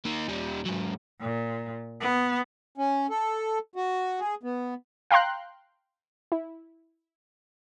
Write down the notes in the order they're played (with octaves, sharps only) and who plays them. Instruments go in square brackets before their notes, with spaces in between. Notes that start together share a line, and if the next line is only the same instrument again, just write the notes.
[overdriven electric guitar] A#3 D#4
D#2 G3
G#2 F#3
[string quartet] A#2
B3
[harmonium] C#4
A4
F#4
G#4
B3
[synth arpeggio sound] F5 G5 A#5 C6 F#6
E4